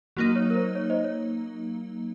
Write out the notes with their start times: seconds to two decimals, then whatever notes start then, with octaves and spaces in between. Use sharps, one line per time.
0.17 F#3 A#3 D#4 F#4
0.36 C#5
0.50 A#4
0.55 C5
0.75 C#5
0.90 C5 D#5
1.04 C#5